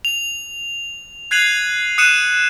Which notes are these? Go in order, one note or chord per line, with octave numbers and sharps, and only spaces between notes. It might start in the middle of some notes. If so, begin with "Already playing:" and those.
F7
F#6 G#6 C7 D#7 F7 F#7
D#6 F#6 C#7 D#7 E7